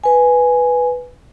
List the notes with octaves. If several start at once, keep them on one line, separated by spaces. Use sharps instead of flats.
B4 G#5